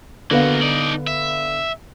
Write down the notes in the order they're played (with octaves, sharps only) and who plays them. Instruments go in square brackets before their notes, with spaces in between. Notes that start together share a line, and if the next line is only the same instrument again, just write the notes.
[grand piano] D3 B3 F5 [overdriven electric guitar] A#3 F#4
[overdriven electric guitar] D#4 D5
E5